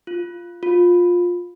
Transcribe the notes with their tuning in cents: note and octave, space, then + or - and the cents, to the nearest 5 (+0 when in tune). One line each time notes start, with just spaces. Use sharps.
F4 -5
F4 +15